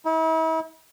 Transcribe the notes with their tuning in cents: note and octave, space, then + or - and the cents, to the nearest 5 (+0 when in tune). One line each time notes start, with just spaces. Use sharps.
E4 -40